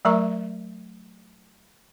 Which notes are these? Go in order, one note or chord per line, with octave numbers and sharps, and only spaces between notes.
F#3 A3 A#4 E5 A#5 C#6